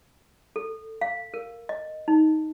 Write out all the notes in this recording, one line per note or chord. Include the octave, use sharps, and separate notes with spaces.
A4
F5
A#4
D#5
D#4